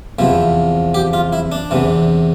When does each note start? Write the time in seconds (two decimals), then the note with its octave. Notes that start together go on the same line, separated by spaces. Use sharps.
0.19 E2 C3 F3 E4
0.94 G4
1.13 F4
1.33 E4
1.52 D4
1.71 E2 C3 E3